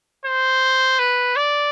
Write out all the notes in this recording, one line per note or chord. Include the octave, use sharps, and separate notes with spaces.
C5
B4
D5